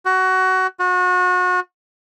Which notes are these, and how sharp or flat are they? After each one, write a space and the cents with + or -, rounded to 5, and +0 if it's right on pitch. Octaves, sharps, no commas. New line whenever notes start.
F#4 +20
F#4 -30